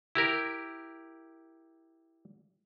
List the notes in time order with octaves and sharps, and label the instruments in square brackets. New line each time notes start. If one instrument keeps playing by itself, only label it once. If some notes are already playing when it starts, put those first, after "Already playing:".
[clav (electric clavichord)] E4 G4 A#4